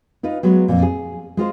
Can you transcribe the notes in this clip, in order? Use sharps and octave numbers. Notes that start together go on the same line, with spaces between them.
D#4 F4 B4 D#5
F#3 G#3 B3
F2 A#2
G#4
G#3 F4 C5